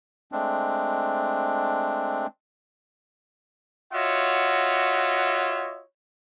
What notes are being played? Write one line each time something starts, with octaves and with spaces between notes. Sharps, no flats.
G#3 A3 C4 D4
F4 F#4 C#5 D#5 E5 F#5